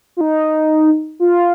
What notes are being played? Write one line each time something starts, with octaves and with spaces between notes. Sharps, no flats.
F4
D#4
F4